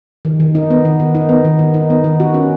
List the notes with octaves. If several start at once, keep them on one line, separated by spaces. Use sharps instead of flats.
D#3
D#3
D#4
B3
D#3
D#3
D#4
B3
D#3
D#3
D#4
B3
D#3
F#4
C#4